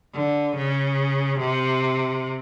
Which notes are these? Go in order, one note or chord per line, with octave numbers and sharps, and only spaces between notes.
D3
C#3
C3